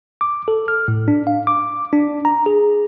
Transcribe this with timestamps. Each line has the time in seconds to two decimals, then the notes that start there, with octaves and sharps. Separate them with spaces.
0.21 D6
0.48 A4
0.68 F6
0.88 A2
1.08 D4
1.27 F5
1.47 D6
1.93 D4
2.25 A#5
2.46 G#4